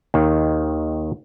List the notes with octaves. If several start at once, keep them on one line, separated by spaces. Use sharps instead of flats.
D#2 D#3